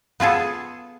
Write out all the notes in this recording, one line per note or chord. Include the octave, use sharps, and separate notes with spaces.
B3 F4 G#4 A4